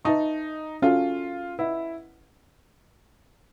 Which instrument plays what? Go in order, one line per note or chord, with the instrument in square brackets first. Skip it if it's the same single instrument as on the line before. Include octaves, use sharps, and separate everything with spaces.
[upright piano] D#4 [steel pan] B4 E5 A5 C#6
[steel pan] C#4 F#4 A4 [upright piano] F4
[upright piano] E4 [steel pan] B4 D#5 F#5 B5